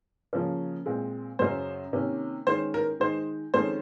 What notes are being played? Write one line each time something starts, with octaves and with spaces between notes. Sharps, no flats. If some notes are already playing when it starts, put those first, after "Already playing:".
C#3 F3 A#3 C#4
A#2 G#3 C4
F#2 C#3 F#3 C#4 C5
C3 D#3 A#3 C#4
D#3 G#3 C#4 C5
A#4
D#3 G#3 D#4 C5
F2 D#3 G#3 C#4 C5